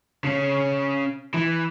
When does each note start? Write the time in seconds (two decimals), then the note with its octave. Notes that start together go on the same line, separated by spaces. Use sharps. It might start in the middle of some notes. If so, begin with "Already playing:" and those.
0.24 C#3 C#4
1.34 E3